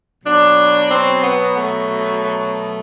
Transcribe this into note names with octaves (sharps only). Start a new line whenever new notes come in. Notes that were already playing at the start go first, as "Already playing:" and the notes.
B2 F#3 D4
C4
B3
A3
A3